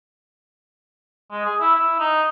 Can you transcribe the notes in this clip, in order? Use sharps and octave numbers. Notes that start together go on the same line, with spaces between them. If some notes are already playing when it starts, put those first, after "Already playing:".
G#3
G#4
E4
E4
D#4